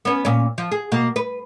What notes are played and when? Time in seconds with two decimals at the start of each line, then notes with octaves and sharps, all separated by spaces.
0.05 B3 C#4
0.25 A#2 C#4
0.58 F3
0.72 G#4
0.92 B2 A#3
1.16 B4